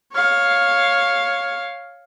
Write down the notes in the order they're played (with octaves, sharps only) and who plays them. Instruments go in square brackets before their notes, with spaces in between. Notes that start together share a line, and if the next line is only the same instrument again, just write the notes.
[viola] C#5 F5